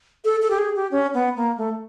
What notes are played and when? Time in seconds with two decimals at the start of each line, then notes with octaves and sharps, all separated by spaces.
0.25 A4
0.42 A4
0.51 G4
0.58 G#4
0.76 G4
0.91 C#4
1.14 B3
1.36 A#3
1.58 A3